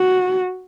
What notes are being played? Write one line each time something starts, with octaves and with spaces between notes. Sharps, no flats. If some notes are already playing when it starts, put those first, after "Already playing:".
Already playing: F#4